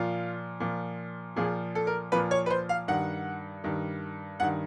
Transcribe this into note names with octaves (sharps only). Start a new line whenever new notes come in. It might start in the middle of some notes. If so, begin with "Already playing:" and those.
Already playing: A#2 F3 F4
A#2 F3
A#2 F3 G#4
A4
A#4
A#2 F3 B4
C#5
B4
C5
F5
G2 D#3 F#5
G2 D#3
G2 D#3 F#5